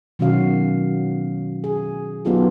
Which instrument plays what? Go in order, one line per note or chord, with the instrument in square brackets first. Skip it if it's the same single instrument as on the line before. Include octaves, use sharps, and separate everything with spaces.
[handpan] B2 D#3 F#3 C#4 F#4 F5
G#4
F#3 B3 D#4 F4 G4 A4